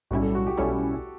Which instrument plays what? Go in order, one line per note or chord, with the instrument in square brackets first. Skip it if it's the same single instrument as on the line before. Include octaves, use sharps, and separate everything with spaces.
[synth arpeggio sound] B1 A2 G3 C#4 E4 [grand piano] F#4
[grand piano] A4
F#4
G4
[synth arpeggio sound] B1 A2 G3 C#4 E4 [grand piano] A4